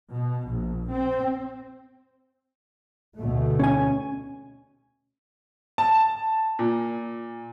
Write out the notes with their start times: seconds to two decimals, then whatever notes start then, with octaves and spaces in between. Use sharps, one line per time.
0.11 B2
0.48 A#1
0.90 C4
3.16 D2 B2 A3
3.59 C#4 G#5
5.78 A5
6.59 A#2